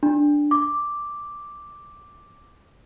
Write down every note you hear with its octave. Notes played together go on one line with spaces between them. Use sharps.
D4
D6